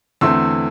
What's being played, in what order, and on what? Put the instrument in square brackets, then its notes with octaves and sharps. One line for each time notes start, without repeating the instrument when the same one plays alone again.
[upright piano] E2 D3 A3 C4 C6 E6